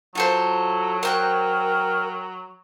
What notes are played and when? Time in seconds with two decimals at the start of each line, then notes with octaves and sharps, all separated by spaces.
0.15 F#3 F4 A4 C5
1.03 A#4 C5 G5 F#6